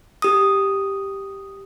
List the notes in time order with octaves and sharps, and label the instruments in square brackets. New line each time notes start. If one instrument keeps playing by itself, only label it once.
[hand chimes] G4 D#6